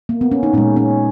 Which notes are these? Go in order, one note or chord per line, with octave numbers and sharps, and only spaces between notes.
A#3
B3
C#4
D#4
A#2 G#3 C#4
C#4